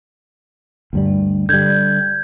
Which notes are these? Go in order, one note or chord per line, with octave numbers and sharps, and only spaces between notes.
D2 G2 G3
D3 G3 G6 G#6